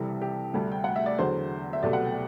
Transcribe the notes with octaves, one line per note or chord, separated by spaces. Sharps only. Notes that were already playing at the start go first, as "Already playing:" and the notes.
Already playing: C2 C3 E3 G3 A4
G4
D2 C3 G3 A4
G5
F#5
E5
D5
E2 D3 F#3 A3 C5
E5
C2 B2 F#3 A3 D5
F#5
G5